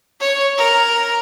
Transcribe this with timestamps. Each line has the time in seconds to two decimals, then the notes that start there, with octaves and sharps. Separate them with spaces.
0.21 C#5
0.57 A#4